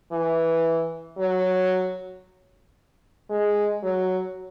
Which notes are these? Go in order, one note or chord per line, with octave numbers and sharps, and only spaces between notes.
E3
F#3
G#3
F#3